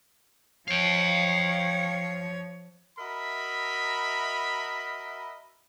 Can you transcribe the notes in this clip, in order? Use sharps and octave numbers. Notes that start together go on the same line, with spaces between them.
F3 C#5 F5 G5
F#4 A#4 D#5 E5 A#5 B5